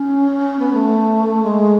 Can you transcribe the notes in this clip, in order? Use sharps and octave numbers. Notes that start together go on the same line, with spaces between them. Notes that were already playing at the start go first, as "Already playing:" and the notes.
Already playing: C#4
B3
A3
G#3